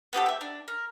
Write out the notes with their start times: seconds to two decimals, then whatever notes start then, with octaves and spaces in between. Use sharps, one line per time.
0.13 B3 C4 G4 A4
0.26 E5 G5
0.41 D4
0.68 A#4